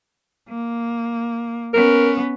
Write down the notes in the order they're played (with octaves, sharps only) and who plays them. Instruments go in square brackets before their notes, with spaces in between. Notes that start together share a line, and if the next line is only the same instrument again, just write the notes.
[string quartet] A#3
[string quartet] B3 C#4 [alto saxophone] A#4